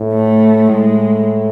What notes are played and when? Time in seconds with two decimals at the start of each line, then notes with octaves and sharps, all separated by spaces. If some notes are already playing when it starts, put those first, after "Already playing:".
Already playing: A2
0.14 A3
0.71 A2 G#3